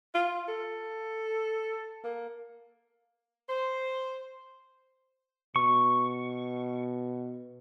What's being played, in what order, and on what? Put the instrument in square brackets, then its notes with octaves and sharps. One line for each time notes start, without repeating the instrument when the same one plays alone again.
[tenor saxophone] F4
A4
A#3
[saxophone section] C5
[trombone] B2 [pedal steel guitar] C#6